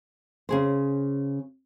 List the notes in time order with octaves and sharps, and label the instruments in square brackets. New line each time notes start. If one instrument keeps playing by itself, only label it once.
[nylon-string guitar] C#3 G#4 C5